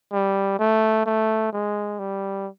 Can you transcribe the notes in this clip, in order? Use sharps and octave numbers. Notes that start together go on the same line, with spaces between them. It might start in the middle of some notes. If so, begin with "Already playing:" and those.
G3
A3
A3
G#3
G3